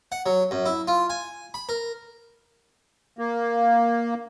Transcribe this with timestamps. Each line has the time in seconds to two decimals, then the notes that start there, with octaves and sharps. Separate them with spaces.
0.12 F#5
0.26 F#3
0.51 F#2
0.66 E4
0.88 F4
1.10 G#5
1.54 B5
1.69 A#4
3.19 A#3